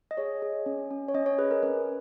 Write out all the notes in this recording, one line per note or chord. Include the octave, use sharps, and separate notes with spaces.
D#5
G#4 C#5
G#4
C#4
C#4
C#5
C#4 D#5
C#5
G#4 B4
A#4
C#4 B4